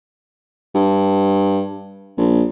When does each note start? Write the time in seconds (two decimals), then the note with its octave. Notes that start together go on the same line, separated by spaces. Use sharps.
0.75 G2
2.18 A#1